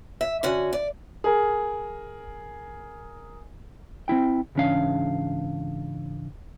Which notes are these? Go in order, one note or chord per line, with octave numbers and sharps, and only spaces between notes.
E5
D3 C#4 F#4
D5
G#4 A#4
C4 C#4 E4 G5
C#2 G#2 E3 C#4 D4 F5